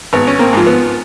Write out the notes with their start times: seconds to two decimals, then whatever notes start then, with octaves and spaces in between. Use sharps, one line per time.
0.13 G#1 B3
0.27 C#4
0.39 A#3 C4
0.53 G#2 F3
0.66 B3